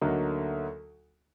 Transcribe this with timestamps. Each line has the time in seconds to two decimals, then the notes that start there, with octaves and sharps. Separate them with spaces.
0.01 D2 D3 F#3 A#3 D#4